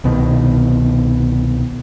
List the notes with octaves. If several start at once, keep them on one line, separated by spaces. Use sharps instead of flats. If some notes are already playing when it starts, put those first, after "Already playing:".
C2 B2 D#3